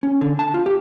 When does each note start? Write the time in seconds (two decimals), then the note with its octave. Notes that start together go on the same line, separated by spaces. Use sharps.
0.03 C#4
0.21 D3
0.39 A5
0.54 F4
0.66 G4